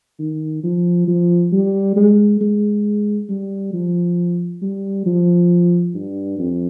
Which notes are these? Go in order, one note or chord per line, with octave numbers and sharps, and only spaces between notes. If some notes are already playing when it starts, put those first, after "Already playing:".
D#3
F3
F3
G3
G#3
G#3
G3
F3
G3
F3
G2
F2